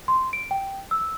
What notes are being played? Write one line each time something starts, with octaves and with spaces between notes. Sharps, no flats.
C6
D7
G5
E6